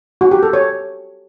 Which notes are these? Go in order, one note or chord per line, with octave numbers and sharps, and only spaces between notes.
F#4
G4
A4
C#5